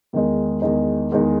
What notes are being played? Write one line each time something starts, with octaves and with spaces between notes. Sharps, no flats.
E2 D#3 G#3 D#4
E2 D#3 G#3 D#4
E2 D#3 G#3 D#4